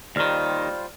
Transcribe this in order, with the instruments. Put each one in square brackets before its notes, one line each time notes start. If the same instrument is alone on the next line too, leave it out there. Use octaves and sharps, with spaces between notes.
[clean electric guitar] D#2 D#3 [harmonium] G3 F4 C5 [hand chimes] D5 F6